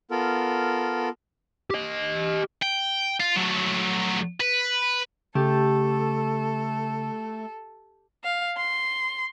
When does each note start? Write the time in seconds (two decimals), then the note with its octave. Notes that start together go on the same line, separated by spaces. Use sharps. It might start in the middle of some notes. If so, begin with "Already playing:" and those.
0.11 B3 F4 A4 A#4
1.70 G4 D#5
2.63 G5
3.20 F4
3.36 F#3 A3
4.40 B4
5.35 C#3 A3 G4 A4
8.24 F5
8.58 C6